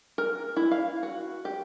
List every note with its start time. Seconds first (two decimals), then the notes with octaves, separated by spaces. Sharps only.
0.18 A#4
0.56 E4
0.71 F5
1.03 F#4
1.45 G4